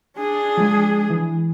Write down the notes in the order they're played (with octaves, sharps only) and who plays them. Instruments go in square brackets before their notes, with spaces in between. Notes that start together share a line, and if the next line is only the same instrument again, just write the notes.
[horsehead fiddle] D4 G#4
[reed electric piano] F3 G#3
E3